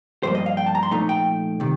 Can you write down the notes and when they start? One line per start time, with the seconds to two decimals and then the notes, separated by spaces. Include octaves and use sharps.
0.23 G2 F3 A#3 C5
0.35 D#5
0.46 F5
0.57 G5
0.66 A5
0.75 A#5
0.83 C6
0.91 A#2 F3 A3 D#4 A#5
1.09 G5
1.60 C3 D#3